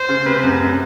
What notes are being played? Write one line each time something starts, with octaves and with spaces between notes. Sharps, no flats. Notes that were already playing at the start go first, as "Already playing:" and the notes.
Already playing: C5
C#3
C3 B4
F#2
F#2